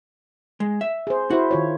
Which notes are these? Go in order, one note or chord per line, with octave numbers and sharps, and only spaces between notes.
G#3
E5
G#4 C5
E4 F#4 C5
D#3 F4 C#5